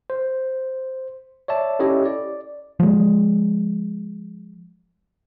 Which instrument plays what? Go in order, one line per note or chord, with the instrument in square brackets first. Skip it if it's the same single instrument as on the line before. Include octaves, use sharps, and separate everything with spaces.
[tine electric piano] C5
C#5 D5 E5 A5
C#4 E4 G4 A4 C#5 D#5
D5
[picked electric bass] F3 G#3